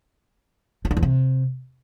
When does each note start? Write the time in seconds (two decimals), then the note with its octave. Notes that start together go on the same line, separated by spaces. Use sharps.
0.85 F3
0.91 D3
0.97 E2
1.03 C3